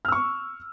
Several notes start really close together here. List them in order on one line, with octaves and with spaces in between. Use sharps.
F6 E6 C#6